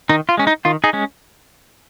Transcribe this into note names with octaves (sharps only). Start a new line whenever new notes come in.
D#3 D#4
F4
G#3 C#4
D#4
D#3 F4
D#4 G#4
G#3 C#4